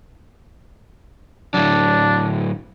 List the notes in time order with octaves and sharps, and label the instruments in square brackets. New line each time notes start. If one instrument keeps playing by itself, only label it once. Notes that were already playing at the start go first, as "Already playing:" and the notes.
[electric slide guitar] A2 D3 F#3 [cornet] D4